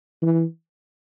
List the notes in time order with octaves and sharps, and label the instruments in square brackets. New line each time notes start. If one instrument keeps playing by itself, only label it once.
[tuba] E3